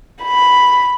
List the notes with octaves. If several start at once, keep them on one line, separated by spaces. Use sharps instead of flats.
B5